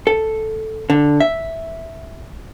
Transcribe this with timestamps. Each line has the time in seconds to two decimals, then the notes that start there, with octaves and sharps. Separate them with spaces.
0.07 A4
0.90 D3
1.20 E5